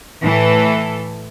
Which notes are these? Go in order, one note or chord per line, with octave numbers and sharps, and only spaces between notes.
A2 E3 A4